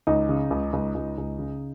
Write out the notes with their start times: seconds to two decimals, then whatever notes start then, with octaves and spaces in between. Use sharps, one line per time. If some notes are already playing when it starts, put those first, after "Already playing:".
0.07 C#2 D#4
0.29 C#3
0.51 C#2
0.73 C#2
0.95 C#2
1.18 C#2
1.39 C#3